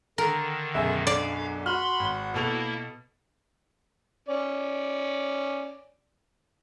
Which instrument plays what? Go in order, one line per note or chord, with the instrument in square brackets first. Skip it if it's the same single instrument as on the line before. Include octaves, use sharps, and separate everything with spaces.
[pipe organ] D3 D#3 [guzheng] A#4
[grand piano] B1 F#2 G#4 [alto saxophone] E5
[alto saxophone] D4 [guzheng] D5 [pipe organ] F5
[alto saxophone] F#4 [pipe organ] B5 C6 [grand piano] F6
[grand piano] G#1
[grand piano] B2 A4 F7 [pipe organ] A#3 E4
[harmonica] C#4 D5